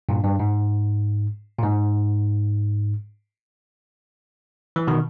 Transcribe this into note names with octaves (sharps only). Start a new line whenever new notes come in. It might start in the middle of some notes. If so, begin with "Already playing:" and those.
G2 A#2
G2
G#2
A#2
G#2
E3
B2 D#3